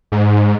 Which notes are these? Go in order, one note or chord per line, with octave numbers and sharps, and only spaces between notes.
G#2